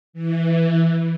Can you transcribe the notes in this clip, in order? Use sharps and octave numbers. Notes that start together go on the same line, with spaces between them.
E3